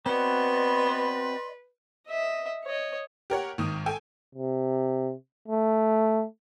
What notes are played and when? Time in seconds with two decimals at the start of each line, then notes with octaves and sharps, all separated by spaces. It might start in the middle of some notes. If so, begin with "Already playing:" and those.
0.06 B3 C4 F#4 B4 D5 D#5 C6
2.07 D#5 E5
2.65 C#5 D#5
3.30 G4 A#4 C#5 F#5
3.58 G#1 D#3 D#6
3.86 A4 G5 G#5
4.35 C3
5.48 A3